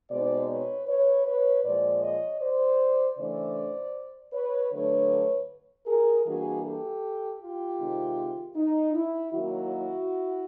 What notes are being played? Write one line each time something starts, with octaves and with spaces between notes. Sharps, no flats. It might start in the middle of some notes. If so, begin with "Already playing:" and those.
B2 G#3 C4 D#4 C5 D5
B4 C#5
B4 C#5
B4 C#5
A#2 F3 G#3 C5 D5
C#5 D#5
C5 D5
C#3 E3 A3 D4 C5 D5
B4 C#5
D3 F#3 A3 D4 B4 C#5
G#4 A#4
E3 G3 A#3 D4 F#4 G#4
G4 A4
F4 G4
C3 D#3 G#3 C4 D#4
D#4
E4
D#3 F#3 A#3 C#4 E4 F#4